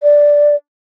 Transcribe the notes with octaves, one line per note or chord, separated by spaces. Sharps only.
D5